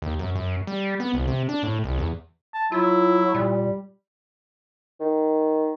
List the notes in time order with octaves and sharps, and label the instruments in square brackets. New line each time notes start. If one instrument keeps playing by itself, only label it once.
[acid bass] D#2
F#2
F#2
G3
B3
C2
C3
D4
A2
C2
E2
[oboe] A5
[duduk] F#3 [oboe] E4 [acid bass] F4
[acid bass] A#2 [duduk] G3
[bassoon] D#3